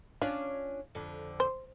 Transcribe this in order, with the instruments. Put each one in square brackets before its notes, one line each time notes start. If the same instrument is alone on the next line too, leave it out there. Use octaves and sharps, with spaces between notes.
[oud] C#4 D4 F4 [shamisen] F5
[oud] F2 D3
[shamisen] C5